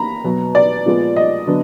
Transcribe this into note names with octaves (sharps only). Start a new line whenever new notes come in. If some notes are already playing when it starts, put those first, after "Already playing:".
Already playing: A#3 A#5 B5
B2 F#3 B3
D5
A#2 F3 G#3 B3
D#5
D3 F#3 B3 D4